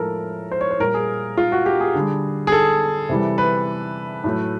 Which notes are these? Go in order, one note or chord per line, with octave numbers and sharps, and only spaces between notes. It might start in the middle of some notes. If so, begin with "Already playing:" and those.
Already playing: A2 F3 G#3 A4 A#4
C5
C#5
C5
A#2 G3 A#4
G#4
F4
F#4
G4
G#4
D3 G3
G#4
A4
C3 E3 G3
B4
A2 F#3 A3